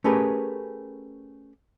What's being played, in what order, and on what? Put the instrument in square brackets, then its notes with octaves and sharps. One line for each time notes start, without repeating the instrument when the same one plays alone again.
[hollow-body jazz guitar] A3 C#4 G4 G#4 A#4 B4